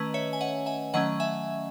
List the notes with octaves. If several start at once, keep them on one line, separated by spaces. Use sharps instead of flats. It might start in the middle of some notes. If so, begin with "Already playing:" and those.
Already playing: D#3 A3 C#4 B4 D#5
C#5 E5
G#5
D#5 F#5
E5 G#5
D#3 F#3 A3 C#4 D#5 F#5
E5 G#5